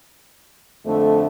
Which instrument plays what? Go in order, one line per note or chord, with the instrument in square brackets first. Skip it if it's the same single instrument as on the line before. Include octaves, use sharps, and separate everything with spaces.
[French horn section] F2 D3 A3